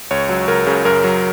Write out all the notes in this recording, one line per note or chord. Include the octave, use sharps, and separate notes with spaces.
C#2 C#5
F#3
C#2 A#4
C#3
F#2 A#4
F#3